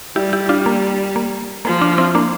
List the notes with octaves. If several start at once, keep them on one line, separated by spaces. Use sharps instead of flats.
G3 E4 G4
E4 G4
D4 F4
A#3
A#3
F3 A#3
D4 F4
C4 E4
A#3 D4